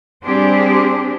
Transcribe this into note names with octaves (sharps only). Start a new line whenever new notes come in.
G3 C4 D4 G4 G#4 C5